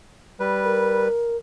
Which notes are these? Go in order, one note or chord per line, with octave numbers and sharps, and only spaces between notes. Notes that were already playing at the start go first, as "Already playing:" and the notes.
G3 B4
A#4